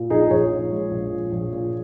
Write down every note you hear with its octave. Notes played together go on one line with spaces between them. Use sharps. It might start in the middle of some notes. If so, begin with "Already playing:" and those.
Already playing: A#2
A#1 D#4 G#4
A#1 G#4 C#5
A#2
G#3
A#1
A#2
A#1
A#2